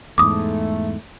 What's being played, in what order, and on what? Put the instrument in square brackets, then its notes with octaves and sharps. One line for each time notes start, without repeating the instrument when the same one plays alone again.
[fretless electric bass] E2 G#2 [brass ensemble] A3 [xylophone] D6 D#6